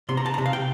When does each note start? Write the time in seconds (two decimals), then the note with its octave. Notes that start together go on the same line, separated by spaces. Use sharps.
0.09 C3 C6
0.17 A#5
0.26 A5
0.34 C3 A#5
0.46 F5
0.53 G5